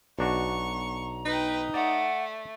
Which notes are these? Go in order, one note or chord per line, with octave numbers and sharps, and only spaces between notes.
B1 D4 F#4 A#5 C#6
D#4 B4 G5
A3 D5 F#5